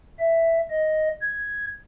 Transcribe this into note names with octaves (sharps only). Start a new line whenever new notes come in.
E5
D#5
G#6